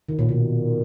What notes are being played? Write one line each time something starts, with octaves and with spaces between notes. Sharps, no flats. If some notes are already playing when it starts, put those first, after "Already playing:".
D#3
A#2
B2